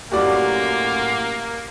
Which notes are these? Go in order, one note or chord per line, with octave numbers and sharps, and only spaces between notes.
F#2 A2 A#3 F#4 G4 D5